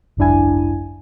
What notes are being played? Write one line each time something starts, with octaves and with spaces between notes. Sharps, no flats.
G#1 C#2 F#2 D4 E4 G#5